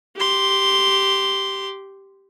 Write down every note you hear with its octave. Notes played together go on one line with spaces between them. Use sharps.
G4 C6